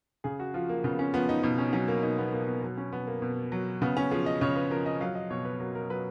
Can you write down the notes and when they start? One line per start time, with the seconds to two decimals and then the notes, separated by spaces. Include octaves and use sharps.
0.24 C#3 G#4
0.40 F#4
0.54 F3 F4
0.69 A#3
0.84 C#3 B3
0.99 C#4
1.14 F3 B3
1.29 D#4
1.43 B2 D#4
1.58 C#4
1.73 F#3 C#4
1.88 A#3
2.03 B2 D#4
2.18 B3
2.33 B2 A#3
2.47 B3
2.63 F#3 B3
2.77 C#4
2.92 B2 B3
3.07 A#3
3.22 B2
3.52 F#3
3.81 C#3 B3
3.97 C#4
4.11 F3 G#4
4.26 D#5
4.41 C#3 C#5
4.56 B4
4.71 F3 A#4
4.86 D#5
5.01 F#3 F5
5.15 D#5
5.30 B2 C#5
5.45 B4
5.60 F#3 A#4
5.75 A#4
5.90 F#3 B4